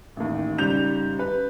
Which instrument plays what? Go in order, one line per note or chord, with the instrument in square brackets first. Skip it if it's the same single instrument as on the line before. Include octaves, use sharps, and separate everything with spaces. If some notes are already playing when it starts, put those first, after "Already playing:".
[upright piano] A1 D#2
G#2 C#3 G3 G6 F7
B4